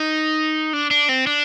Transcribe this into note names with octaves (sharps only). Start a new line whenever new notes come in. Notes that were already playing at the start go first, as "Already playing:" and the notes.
Already playing: D#4
D4
D4
C4
D4